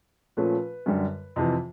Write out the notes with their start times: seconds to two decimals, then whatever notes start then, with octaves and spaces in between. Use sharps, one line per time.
0.37 A#2 F3 A3 C#4 B4
0.86 F#2 D3 G3
1.36 F2 C3 E3